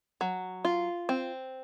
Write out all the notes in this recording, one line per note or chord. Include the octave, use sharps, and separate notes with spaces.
F#3
F4
C4